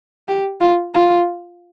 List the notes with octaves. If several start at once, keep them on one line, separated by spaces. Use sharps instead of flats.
G4
F4
F4